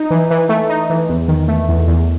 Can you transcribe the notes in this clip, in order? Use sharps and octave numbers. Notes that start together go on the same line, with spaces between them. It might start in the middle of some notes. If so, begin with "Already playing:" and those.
Already playing: D#4
E3
E3
A3
D#4
E3
E2
D#3
A3
E2
E2